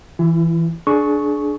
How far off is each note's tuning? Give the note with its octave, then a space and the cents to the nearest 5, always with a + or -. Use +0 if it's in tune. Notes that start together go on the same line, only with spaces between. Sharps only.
E3 +0 E4 +40
D4 +0 G#4 +30 C#6 +0